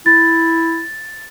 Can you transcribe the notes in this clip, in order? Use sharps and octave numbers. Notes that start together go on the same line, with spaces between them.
E4 A6